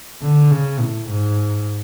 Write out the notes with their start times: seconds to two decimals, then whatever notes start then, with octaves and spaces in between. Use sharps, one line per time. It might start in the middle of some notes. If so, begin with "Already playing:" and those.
0.22 D3
0.51 C#3
0.79 A2
1.08 G#2